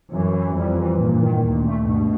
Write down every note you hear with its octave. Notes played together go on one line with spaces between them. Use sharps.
F#2 E3
E3
F2 G3
E3
G2 A#2
D#3
D2 A#2
A3
G2 B2